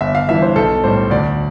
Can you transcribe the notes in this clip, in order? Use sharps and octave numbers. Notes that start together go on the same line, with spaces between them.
G1 E5
F5
G2 E3 E5
C5
B1 A4
A2 G3 C5
D2 D5